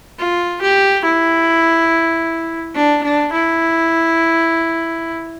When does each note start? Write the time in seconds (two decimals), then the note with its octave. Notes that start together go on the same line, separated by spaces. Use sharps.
0.19 F4
0.61 G4
1.04 E4
2.75 D4
3.03 D4
3.32 E4